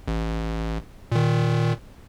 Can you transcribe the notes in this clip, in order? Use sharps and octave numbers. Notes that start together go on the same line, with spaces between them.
A1
A#2 D#3